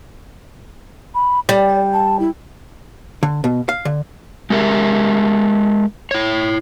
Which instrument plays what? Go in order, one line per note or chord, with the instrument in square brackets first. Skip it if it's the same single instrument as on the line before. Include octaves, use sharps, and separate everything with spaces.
[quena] B5
[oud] G3 [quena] D5
[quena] A5
E4
[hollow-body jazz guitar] D3
B2
F5
D3
[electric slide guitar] G#3 G4 A#4 E5
E4 C#5